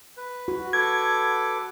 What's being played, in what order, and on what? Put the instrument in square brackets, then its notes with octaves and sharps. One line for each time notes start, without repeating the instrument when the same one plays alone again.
[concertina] B4
[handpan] F#4
[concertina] A4 B4 D6 [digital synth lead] G#6